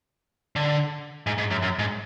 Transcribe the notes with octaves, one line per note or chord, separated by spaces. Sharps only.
D3
G#2
G#2
F#2
F#2
G#2